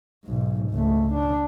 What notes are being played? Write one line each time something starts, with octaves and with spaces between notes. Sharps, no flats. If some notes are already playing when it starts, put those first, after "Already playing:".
B1 G#2
C#2 A3
D4